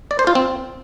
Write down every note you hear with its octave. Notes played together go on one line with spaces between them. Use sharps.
D5
C5
F4
C4